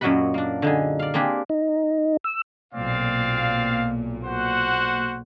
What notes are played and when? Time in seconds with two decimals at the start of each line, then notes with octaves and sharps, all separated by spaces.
0.01 F#2 A#2 F#3 D#5 F#5 B5
0.34 A#3 D4
0.62 D3 D#4 G#4
0.99 D5 F5
1.14 A#3 C4 D4 G4 G#4
1.49 D#4
2.24 E6
2.74 B1 A#2 C4 D5 F5
4.25 F#4 C5 F#5